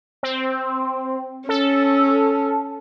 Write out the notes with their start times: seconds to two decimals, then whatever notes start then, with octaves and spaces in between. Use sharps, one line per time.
0.23 C4
1.49 C#4 A4